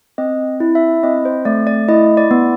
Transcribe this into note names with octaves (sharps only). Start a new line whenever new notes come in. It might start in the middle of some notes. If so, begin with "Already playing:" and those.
C4 D#5
E4
E5
C4 D#5
C5
A3 D5
D5
E4 D#5
D5
B3